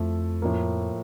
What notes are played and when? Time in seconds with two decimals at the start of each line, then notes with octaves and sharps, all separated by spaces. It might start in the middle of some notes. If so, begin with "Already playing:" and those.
Already playing: F2 F3 A3 E4
0.42 A2 F3 A#3